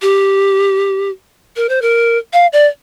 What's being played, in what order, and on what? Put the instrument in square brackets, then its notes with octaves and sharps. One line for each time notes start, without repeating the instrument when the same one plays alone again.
[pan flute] G4
A#4
C5
A#4
F5
D5